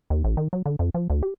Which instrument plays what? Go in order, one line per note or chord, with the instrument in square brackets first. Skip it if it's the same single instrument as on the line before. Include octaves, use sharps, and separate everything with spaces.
[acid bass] D#2
A1
D#3
F#3
D3
F2
F3
D2
G4